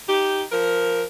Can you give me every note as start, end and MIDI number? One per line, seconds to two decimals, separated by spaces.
0.07 0.42 63
0.07 0.42 67
0.52 1.03 53
0.52 1.03 70